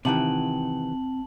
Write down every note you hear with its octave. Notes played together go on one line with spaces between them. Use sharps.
C3 D#3 E3 C4 F#5 G5 A5 F#7